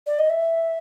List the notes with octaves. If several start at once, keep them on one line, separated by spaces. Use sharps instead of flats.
D5
D#5
E5